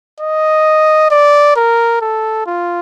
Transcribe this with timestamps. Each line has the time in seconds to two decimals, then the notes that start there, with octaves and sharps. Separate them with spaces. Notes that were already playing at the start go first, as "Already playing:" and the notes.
0.21 D#5
1.11 D5
1.56 A#4
2.01 A4
2.46 F4